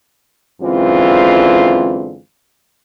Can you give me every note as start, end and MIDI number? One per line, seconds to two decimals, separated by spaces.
0.61 2.17 42
0.61 2.17 50
0.61 2.17 52
0.61 2.17 56
0.61 2.17 60
0.61 2.17 65